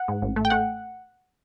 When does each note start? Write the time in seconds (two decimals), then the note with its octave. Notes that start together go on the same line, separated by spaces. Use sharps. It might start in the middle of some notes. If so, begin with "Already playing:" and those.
Already playing: F#5
0.08 G#2
0.22 A1
0.36 A3
0.45 G5
0.50 A3 F#5